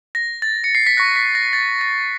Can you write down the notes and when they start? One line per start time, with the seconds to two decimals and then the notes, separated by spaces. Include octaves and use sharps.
0.15 A#6
0.42 A6
0.64 C#7
0.75 C7
0.87 B6
0.97 C#6 F#6 A#6
1.16 B6
1.35 A#6
1.53 A6
1.81 A#6